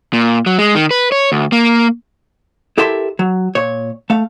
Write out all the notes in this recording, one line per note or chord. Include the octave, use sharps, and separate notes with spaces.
A#2
F#3
G#3
D#3
B4
C#5
D2
A#3
E4 G4 A4 A#4 E5 C6
F#3
A#2 C#5
A3 F5